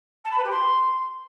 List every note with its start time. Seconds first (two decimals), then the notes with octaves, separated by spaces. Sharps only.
0.24 A5
0.31 B5
0.37 B4
0.44 G4
0.50 C6